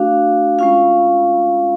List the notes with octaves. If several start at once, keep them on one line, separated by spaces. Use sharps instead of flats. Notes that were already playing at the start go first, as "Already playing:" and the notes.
Already playing: A3 D4 F#4 F5
G#3 C#4 F4 F5